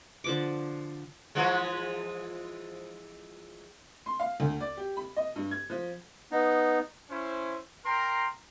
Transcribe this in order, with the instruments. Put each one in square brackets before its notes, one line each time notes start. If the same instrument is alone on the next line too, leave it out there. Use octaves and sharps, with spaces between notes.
[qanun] D3 F3 D6
[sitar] E3 F3 G#3
[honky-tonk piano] C6
F5
D2
D5
G4
B5
D#5
G2
G#6
F3
[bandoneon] B3 D#4
[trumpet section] C#4 E4 C5
A#4 G5 A#5 C6